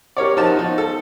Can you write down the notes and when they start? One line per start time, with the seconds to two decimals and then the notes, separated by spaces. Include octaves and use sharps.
0.17 G4 A#4 C#5 D5
0.37 F3 D#4 F#4 A#4 A5
0.56 F3 D#4
0.78 A4